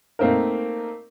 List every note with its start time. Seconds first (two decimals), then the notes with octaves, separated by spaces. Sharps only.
0.19 A3 A#3 C4 D#4 A#4